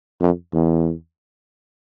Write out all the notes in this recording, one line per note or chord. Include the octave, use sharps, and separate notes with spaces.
F2
E2